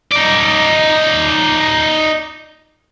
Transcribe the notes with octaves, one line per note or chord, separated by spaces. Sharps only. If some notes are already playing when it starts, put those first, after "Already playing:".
D#4 D5